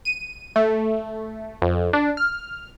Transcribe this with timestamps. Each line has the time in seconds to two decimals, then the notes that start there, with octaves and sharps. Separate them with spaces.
0.05 D#7
0.56 A3
1.62 F2
1.93 D4
2.17 F6